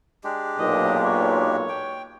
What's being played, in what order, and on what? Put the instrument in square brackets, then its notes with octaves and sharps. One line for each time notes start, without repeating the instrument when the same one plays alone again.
[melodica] G#3 D4 G4
[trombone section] B1 A#2 [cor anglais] D#5
[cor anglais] C#5
[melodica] G5